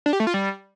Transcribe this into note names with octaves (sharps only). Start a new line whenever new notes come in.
D4
G4
A3
F4
G3